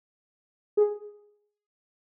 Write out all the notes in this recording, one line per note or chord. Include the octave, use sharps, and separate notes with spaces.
G#4